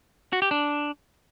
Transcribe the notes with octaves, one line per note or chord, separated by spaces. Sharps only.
F#4
G4
D4